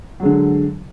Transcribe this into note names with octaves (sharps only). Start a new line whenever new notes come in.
D3 F#3 G#3